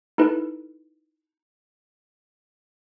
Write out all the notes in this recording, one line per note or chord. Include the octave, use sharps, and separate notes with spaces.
D#4 E4 A4 B4